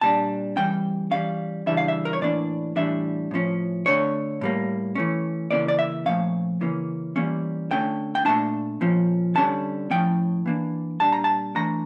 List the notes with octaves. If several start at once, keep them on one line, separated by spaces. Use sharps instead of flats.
A#2 G3 D4 A5
E3 G3 C#4 G5
E3 G3 C#4 F5
C#3 E3 G3 D4 E5
F5
E5
A#4
C#5
A2 E3 A#3 D4 D5
A2 E3 G3 D4 E5
A2 F3 C#4
D3 A3 D4 C#5
A2 G3 A#3
E3 A3 C#4
C#3 E3 A#3 C#4 D5
D5
E5
A#2 F3 A3 C#4 F5
C#3 E3 A#3 C#4
E3 G3 A#3 C#4
D3 A3 C#4 G5
G5
A#2 A3 D4 A5
A#2 F3 C#4
D3 G3 C#4 A5
A2 F3 C#4 G5
E3 A#3 D4
A#2 G3 D4 A5
A#5
A5
E3 A3 D4 A#5